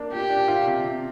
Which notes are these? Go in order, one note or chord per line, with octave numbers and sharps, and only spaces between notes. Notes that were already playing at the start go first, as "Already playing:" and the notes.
Already playing: A#3 D4
A#2 G4
D4
F4
C3
C3